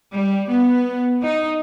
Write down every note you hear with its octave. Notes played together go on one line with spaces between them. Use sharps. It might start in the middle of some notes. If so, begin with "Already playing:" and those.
G3
B3
D#4